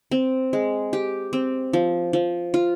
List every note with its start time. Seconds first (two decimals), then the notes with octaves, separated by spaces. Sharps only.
0.11 C4
0.53 G#3
0.93 G4
1.33 C4
1.73 F3
2.13 F3
2.54 F4